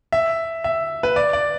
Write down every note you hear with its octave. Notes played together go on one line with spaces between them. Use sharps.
E5
E5
B4
D5
D5